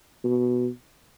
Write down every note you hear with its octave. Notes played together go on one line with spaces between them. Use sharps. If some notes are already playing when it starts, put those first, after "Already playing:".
B2